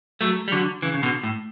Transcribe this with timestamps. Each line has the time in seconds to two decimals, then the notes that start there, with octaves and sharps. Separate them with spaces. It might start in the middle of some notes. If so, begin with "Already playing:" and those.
0.21 F#3 A3
0.48 G3
0.52 D3 F#3
0.82 C#3 E3
0.94 C#3
1.03 B2 D3
1.23 A2